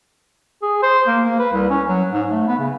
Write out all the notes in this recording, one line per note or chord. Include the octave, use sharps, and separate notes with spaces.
G#4
C5
A#3
A#3
B4
C2
C#4
F#3
G#2
A3
B3
C#3